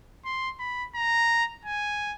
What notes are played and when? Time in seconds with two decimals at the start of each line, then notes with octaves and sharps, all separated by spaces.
0.25 C6
0.60 B5
0.95 A#5
1.65 G#5